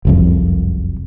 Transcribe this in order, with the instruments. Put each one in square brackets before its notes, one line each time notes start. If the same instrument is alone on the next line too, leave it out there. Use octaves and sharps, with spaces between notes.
[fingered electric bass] F#1 C2 F2